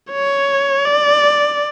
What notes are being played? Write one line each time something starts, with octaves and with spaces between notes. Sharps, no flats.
C#5
D5